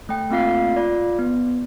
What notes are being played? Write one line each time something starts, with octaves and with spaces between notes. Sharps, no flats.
A3 G5
A3 A#3 C4 F4 F5 C7
F4 D5
B3